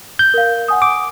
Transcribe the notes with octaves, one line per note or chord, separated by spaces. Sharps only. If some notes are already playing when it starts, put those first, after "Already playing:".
G6
A#4 F5
F#5 G#5 D#6
D6